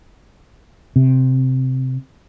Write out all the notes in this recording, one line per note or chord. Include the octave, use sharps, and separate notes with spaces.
C3